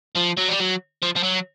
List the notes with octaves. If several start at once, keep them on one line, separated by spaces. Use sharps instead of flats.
F3
F#3
G3
F#3
F3
F3
F#3